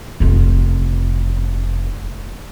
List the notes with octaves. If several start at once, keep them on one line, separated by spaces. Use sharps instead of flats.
F1 F4